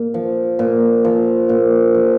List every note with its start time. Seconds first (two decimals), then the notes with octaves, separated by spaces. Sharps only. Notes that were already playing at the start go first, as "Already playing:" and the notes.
Already playing: A#2
0.14 F3
0.59 A#2
1.05 F3
1.49 A#2
1.94 F3